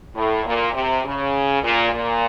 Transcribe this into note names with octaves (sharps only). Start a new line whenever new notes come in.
A2
A#2
C3
C#3
A#2
A#2